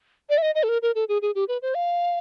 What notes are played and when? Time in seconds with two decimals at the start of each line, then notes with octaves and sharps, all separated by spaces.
0.30 D5
0.38 E5
0.42 D#5
0.55 D#5
0.63 A4
0.69 A#4
0.82 A#4
0.95 A4
1.09 G#4
1.22 G#4
1.35 G4
1.48 B4
1.62 C5
1.75 F5